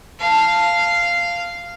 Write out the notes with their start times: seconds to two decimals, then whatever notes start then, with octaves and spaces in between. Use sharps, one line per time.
0.20 F5 A5